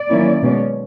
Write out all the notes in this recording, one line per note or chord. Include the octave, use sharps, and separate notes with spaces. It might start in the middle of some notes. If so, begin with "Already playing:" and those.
Already playing: D5
D#3 F#3 A#3 C#4 E4
B2 G#3 C#4